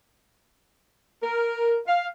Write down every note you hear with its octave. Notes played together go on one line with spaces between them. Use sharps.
A#4
F5